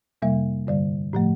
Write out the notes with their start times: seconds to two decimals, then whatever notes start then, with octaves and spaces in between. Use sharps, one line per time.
0.22 F2 C3 G3 A#3 E5
0.67 G2 D3 G3 D5
1.13 A2 F3 A3